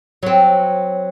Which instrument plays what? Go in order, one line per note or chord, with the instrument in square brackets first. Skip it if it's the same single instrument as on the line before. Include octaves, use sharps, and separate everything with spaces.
[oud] F#3 C4